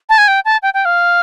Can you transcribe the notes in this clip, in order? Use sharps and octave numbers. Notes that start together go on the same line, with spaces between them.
A5
G#5
G5
A5
G5
G5
F5